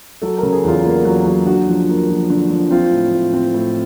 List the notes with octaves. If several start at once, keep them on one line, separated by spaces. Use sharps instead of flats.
F#3 A4
C#3 A#4
G#4
E2 F4
A#3
F#3
F#3
D3 F#4
F3
A#3
F3
D3
F3
C4 F4
A2
A2
C4
A2